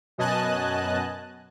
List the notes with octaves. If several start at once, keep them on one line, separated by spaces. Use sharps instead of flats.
F#2 B2 D#5 G#5 A5 F#6